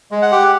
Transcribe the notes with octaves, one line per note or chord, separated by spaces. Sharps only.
G#3
F#5
G4